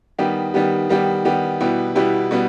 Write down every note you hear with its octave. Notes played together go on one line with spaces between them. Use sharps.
D#3 G3 B3 G4
D#3 G3 B3 G4
D#3 G3 B3 G4
D#3 G3 B3 G4
B2 G3 B3 E4 G4
B2 G3 B3 E4 G4
B2 G3 B3